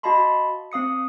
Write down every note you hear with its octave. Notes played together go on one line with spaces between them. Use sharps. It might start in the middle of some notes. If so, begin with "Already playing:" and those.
F#4 D#5 F5 A5 B5 C6
C4 F5 D#6 C#7